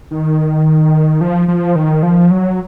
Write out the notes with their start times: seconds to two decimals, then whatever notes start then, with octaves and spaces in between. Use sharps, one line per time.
0.11 D#3
1.21 F3
1.48 F3
1.76 D#3
2.03 F3
2.31 F#3